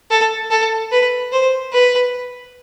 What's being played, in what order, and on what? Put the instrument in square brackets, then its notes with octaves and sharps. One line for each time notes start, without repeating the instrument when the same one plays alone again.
[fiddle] A4
A4
B4
C5
B4